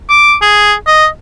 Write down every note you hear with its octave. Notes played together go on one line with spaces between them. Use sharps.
D6
G#4
D#5